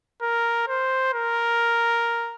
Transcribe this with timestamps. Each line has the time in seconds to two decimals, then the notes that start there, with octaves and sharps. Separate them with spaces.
0.22 A#4
0.68 C5
1.14 A#4